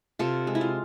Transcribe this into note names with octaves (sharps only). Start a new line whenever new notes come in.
C3 F4 A4
G#3
E4
F4